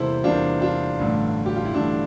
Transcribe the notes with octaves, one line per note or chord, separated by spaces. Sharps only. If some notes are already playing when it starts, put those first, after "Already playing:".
Already playing: E2 C3 G3 A#3 E4 A4 C5
E2 C3 G3 A#3 D4 F4
D4 F4
A1 G2 D3 A3
G4
F4
E4
A1 G2 D3 A3 D4